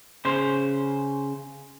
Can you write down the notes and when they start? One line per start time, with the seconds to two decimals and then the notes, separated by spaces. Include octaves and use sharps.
0.25 C#3 C5